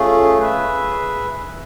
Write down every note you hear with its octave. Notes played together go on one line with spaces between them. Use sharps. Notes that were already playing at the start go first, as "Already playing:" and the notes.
Already playing: A3 C#4 F4 G#4
G#4 B4 E5